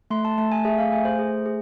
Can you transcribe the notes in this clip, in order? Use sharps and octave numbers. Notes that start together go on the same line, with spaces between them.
A3 C6
A5
A3 A5
G#5
G#4 E5
F5
A3 G#5
C5
G#4
G#4